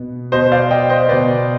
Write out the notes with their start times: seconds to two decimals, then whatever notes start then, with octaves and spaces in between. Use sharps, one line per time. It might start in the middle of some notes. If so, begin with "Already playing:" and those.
Already playing: B2 B3
0.32 B2 B3 C5 D#5
0.52 D5 F5
0.71 D#5 G5
0.89 C5 D#5
1.08 B2 B3 B4 D5